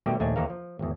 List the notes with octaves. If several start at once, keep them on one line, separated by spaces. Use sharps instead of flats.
B2 D#3 G3 A3 G4
A#1 D#2 A3 D4 D#4 G#5
D#2 E3 D#4 A4 A#4 F5
F3
G#1 E2